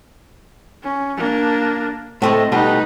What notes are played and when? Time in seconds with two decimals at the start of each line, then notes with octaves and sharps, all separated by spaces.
0.83 C#4
1.17 A#3 D4
2.22 A2 A3 C4 D#5
2.52 B2 G3 A3 D#4 B4